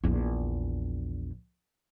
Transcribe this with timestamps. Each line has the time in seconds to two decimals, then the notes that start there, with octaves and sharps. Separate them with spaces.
0.04 A#1 E2